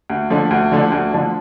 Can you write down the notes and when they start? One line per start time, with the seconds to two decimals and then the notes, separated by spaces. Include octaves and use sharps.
0.10 D2
0.30 D3 F3 A3 D4
0.51 D2
0.72 D3 F3 A3 D4
0.92 D2
1.13 D3 F3 A3 D4